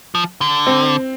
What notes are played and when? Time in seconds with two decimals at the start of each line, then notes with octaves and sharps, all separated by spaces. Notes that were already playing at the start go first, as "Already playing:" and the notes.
0.15 F3
0.41 D3
0.66 C4